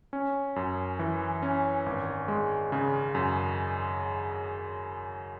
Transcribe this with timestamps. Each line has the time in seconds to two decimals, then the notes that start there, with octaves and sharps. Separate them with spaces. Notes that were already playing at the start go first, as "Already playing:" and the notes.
0.13 C#4
0.56 F#2
0.99 E3
1.42 C#4
1.86 G#1
2.28 G#3
2.72 C#3
3.15 F#2